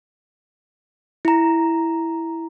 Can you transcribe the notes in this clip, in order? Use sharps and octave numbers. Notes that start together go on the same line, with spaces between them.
E4 A#5